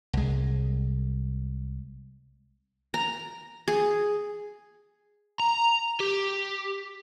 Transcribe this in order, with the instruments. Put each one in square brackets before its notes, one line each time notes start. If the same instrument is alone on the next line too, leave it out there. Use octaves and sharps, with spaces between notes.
[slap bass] C2 G#3
[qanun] A#5
G#4
[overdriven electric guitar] A#5
G4